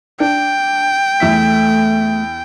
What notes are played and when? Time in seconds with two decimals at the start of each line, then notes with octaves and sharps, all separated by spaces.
0.20 D4 G5
1.20 E2 A3 E5 B6